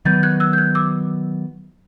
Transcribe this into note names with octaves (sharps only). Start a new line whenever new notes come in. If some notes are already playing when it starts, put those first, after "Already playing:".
D#3 F#3 B3 G6 A6
F#6 G#6
E6 F#6
G6
F#6 G#6
D6 E6